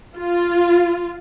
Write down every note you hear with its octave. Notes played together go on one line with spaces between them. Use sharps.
F4